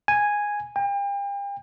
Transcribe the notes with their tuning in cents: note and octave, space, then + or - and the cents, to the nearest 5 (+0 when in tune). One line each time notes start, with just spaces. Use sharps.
G#5 -5
G5 +40